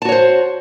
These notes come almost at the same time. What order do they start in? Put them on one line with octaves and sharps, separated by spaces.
A5 F#4 C#5 C5